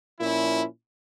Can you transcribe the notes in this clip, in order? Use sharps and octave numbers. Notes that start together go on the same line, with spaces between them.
A#2 F3 C#4 E4